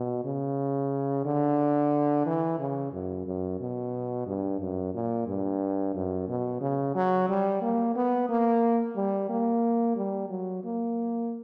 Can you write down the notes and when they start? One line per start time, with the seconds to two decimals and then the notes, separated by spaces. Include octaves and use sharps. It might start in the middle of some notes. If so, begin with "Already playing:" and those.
Already playing: B2
0.25 C#3
1.25 D3
2.26 E3
2.59 C#3
2.93 F#2
3.26 F#2
3.60 B2
4.26 G2
4.60 F#2
4.94 A#2
5.27 G2
5.94 F#2
6.28 B2
6.61 C#3
6.95 F#3
7.29 G3
7.62 A#3
7.95 B3
8.29 A#3
8.96 G3
9.29 A#3
9.96 G3
10.29 F#3
10.64 A#3